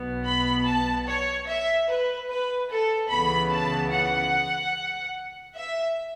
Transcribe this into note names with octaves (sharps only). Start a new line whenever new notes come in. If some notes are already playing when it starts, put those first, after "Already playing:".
Already playing: B1 B2 B3
B5
A5
C#5
E5
B4
B4
A4
C#2 C#3 E3 B3 B5
A5
F#5
E5